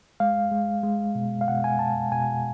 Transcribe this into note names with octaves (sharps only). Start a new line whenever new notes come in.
G#3 F5
G#3
G#3
B2
F5
B2 F#5
G#5
B2 A5
B2 G#5